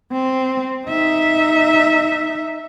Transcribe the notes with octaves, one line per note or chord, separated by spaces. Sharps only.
C4
D#4 E5